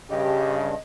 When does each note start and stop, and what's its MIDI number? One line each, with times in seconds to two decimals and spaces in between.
0.10 0.75 43
0.10 0.75 49
0.10 0.58 67
0.10 0.77 75